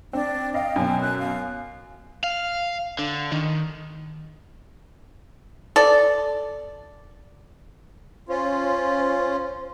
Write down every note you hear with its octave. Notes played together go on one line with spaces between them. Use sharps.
C4 D4
D#5 F5 G5
F#2 B2
F#6
F5
F5
D3
D#3
A4 D5
C#4 F4 C5